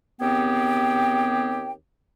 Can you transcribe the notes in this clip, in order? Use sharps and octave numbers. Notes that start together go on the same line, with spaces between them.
D#2 B3 C4 G4 G#4 G5